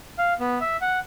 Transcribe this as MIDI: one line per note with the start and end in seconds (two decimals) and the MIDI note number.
0.18 0.33 77
0.40 0.59 59
0.61 0.77 76
0.81 0.99 78